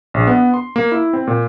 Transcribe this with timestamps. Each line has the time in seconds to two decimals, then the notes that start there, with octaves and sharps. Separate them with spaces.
0.14 A#1
0.27 B3
0.54 C6
0.76 A#3
0.92 E4
1.13 C4
1.27 A#2